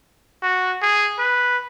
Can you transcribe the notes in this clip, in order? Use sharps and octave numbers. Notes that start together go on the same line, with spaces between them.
F#4
G#4
B4